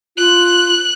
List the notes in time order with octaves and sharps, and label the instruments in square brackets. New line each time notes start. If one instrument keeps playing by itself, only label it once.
[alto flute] F4 [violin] F#6